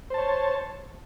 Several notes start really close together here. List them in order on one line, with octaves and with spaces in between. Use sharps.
C5 A5 C#5